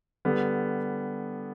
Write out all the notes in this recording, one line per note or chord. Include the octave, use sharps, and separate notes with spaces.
D3 G3 B3